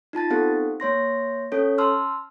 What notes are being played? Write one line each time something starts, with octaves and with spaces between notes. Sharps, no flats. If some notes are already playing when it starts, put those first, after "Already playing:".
D#4 F4 A5 A6
B3 C4 D#4 G4 A4
A#3 C#5 C6 A#6
C#4 A4 C#5
A5 C6 E6 F6